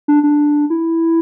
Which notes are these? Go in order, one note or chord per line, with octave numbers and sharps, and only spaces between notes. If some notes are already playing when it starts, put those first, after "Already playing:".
D4
D4
E4